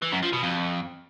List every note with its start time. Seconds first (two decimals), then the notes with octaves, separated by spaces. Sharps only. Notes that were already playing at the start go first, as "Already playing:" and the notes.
0.02 E3
0.12 F#2
0.22 F3
0.33 B2
0.43 F2